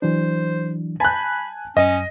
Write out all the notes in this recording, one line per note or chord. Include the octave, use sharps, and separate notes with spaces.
E3 F#3 D4 C5
G#5 A5 B5 F#6 G6
F#2 C#4 D#5